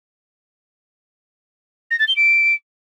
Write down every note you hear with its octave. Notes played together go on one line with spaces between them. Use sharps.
A#6
A6
G7
D7